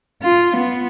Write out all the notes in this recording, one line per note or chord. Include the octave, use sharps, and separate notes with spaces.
F4
B3